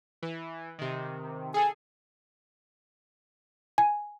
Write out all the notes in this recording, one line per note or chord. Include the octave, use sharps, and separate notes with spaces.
E3
C3 D#3
G#4 A4 G#5
G#5